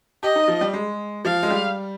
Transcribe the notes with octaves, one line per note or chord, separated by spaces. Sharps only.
G4 D#5
D#4
F3
G3
G#3
F3 F5
G#3
G3